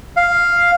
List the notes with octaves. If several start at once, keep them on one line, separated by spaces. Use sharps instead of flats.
F5